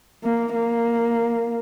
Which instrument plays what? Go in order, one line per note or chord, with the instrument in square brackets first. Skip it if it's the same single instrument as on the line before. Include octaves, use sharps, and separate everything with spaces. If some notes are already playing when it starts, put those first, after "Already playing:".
[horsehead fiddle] A#3
A#3